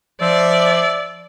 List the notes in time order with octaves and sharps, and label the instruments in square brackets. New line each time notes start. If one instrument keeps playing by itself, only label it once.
[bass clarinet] F3 [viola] D5 [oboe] E5